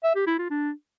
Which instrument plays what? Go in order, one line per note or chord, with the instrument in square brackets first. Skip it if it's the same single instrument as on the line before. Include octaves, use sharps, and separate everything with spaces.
[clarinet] E5
G4
E4
F4
D4